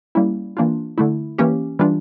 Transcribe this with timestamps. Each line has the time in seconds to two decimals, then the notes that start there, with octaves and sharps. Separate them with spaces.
0.15 G3 A#3 C#4 E4
0.57 E3 A#3 D4 F4
0.98 D3 A3 E4
1.38 E3 A#3 C#4 G4
1.79 E3 G3 D4 F4